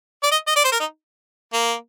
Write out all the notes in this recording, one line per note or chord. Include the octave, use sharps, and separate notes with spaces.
D5
D#5
D#5
D5
C5
A#4
D#4
A#3